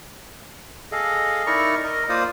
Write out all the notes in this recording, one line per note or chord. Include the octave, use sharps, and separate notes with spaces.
G#4 A4 D#5 F5
D#4 E4 A#4 D5 A#5 C#6
A#4 D#5
A#3 F4 C5 D5 F5 D#6